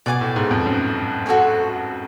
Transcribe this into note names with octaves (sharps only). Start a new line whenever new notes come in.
B2 D5 G#5 D6
A2
G#2
F2
F#2
F#4 A4 C#5 G#5